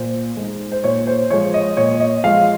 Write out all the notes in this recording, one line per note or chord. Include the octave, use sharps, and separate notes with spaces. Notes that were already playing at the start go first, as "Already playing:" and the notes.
Already playing: A#2 C5
G#3 D#4
C5
A#2 C#5
C5
F3 G#3 C#5
D#5
A#2 C#5
D#5
F3 G#3 F5